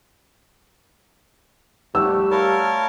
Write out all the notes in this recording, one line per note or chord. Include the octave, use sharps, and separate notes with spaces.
G3 A3 F#4 G4 E6
A#4 C#5 F5 A5 B5